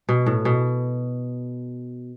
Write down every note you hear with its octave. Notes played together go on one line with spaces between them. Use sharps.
B2
A2
B2